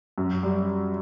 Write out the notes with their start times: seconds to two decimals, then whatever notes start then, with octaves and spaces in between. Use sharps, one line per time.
0.18 F#2
0.43 G3